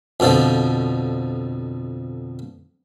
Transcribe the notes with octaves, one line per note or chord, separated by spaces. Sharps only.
F2 B2 D3 F3